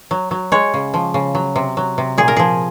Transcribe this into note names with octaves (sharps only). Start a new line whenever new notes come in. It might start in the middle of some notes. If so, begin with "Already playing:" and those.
F#3
F#3
G#3 C#5
C#3
F3
C#3
F#3
C3
F#3
C3
A#2 G#4
A#4
F3 G#4